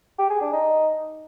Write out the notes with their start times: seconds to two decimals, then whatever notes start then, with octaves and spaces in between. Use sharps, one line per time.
0.18 G4
0.30 G#4
0.41 D4
0.53 D#4